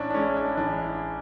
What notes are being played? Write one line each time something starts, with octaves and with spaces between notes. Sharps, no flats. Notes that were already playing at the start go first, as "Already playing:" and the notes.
Already playing: A1 C#4 D4 E4
D4
G#3 C#4
D4
A1 D4